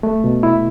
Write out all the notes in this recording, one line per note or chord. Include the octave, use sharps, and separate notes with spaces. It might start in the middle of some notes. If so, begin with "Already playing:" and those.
A3
B2
E4